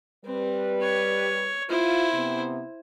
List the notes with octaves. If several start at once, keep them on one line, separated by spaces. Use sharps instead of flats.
G3 C4 B4
C#5
E4 F4 C5
C3 B3